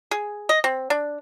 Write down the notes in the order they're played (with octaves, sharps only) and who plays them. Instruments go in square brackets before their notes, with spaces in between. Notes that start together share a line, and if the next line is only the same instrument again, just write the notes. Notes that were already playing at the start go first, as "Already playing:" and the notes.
[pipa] G#4
D#5
C4
D4